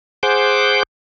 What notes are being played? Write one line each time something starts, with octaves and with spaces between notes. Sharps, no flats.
G#4 C5 F#5 D6 G6